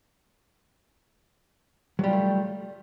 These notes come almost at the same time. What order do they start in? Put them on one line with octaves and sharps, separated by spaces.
F#3 G3 F4 A3